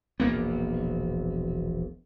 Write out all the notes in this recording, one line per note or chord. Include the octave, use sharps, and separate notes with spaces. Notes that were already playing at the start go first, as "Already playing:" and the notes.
E1 A#1 A#3 B3